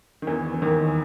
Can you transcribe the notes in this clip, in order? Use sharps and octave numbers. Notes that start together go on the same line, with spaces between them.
D#3
E2 E3
E3
D#2 D#3